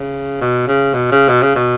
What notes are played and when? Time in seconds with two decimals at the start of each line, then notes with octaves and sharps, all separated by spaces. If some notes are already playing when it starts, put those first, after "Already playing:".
Already playing: C#3
0.41 B2
0.68 C#3
0.94 B2
1.12 C#3
1.29 B2
1.42 C#3
1.55 B2